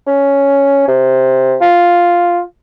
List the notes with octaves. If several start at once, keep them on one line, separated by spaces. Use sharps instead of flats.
C#4
C3
F4